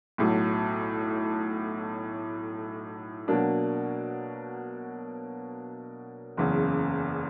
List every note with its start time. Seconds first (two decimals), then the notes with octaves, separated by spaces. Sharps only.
0.18 B1 A2 F#3
3.28 B2 F#3 A#3 D4
6.37 F#1 E2 C#3